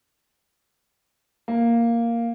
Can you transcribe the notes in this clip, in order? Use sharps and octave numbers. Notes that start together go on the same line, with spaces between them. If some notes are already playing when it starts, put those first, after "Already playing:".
A#3